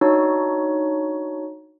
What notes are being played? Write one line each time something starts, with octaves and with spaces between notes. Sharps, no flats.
D4 D#4 F#4 C#5